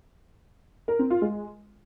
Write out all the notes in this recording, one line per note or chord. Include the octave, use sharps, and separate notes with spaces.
A#4
C4
F4
G#3